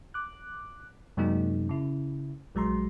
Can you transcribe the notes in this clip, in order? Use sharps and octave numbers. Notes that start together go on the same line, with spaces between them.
D6 F#6
F#2 C3 F#3 G#3 A#3 D#4
C#3 E4
A#1 F#3 G#3 A#5 C6